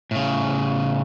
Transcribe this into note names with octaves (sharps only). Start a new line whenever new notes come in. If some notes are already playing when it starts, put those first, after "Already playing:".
A2 C#3